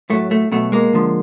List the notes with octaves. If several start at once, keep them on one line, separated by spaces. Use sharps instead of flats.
A2 F#3 A3
A3
B2 F#3 A3
G#3 A#3
D3 F3 G#3